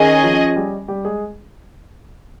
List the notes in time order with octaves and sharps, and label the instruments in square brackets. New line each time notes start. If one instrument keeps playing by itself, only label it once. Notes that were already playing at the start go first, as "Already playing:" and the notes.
Already playing: [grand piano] D#3 D#4 [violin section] C#4 G#4 D#5
[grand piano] F3 F4
G3 G4
G3 G4
G#3 G#4